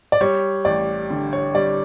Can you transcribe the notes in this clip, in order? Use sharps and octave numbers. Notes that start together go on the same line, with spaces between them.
D5
G3 C#5
A1 D5
D3
C#5
G3 D5